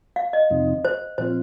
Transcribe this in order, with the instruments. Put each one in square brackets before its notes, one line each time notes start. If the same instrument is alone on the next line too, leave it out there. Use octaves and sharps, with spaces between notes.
[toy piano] F5
D#5
[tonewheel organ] F2 C3 F3 C4 D#4
[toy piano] C5
[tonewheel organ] A#2 F3 C4 F4 [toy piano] C5